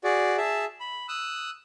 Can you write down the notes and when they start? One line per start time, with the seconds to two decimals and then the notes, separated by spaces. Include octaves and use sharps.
0.04 F#4 G#4 D5
0.38 G#4 E5 A5
0.80 B5
1.08 D#6 E6 F#6